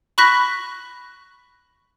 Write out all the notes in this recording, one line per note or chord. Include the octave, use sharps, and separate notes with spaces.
B5 C#6 F#6 A#6 B6